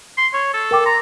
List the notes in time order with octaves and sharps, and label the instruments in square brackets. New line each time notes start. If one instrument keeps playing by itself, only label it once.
[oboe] C6
C#5
A4
[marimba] A#4 G5 D6
[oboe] A#5 [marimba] C6